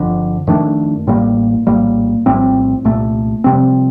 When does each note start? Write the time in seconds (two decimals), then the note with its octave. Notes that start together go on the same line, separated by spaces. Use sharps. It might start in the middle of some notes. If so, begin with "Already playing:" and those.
Already playing: G1 F2 D3
0.47 F2 D#3 A3 D4
1.07 A1 A2 G3 A#3
1.67 A#1 A2 G3 A#3
2.26 A#1 A2 G3 C4
2.85 C2 A#2 A3
3.44 F2 C3 G3 C4